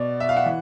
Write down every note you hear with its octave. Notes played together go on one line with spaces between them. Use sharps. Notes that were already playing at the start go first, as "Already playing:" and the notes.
Already playing: B2 D5
E5
F5
F#5
E3